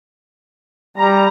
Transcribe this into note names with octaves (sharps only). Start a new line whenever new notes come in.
G3 A#5